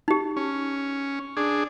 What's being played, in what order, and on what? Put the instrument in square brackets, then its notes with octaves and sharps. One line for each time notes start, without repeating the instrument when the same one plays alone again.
[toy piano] D#4 G4
[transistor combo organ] C#4
D4 G#4